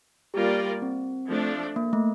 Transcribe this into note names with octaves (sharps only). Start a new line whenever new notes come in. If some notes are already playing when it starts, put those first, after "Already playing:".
G3 A#3 F4 G4 A#4 D5
C4
F3 A3 D4
A#3
A3